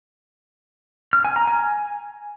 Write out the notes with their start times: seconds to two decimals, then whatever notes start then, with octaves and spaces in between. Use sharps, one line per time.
1.13 F6
1.25 G#5
1.36 A#5
1.48 G#5